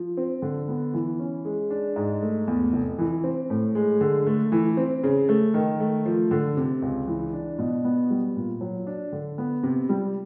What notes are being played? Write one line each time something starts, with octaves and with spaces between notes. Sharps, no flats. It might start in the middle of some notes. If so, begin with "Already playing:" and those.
Already playing: F3
C4
D3
B3
E3
C#4
G#3
D4
G#2
A3
E2
F1
E3
C4
A2
G#3
D3
A3
E3
C4
C#3
A3
D#3
A3
F3
D3
C3
C#2
E3
D4
B2
B3
G3
A#2
F#3
D4
D3
B3
C3
G3